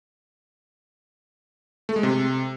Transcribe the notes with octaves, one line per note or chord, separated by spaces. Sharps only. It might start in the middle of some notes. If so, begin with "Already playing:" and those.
A3
G#3
C3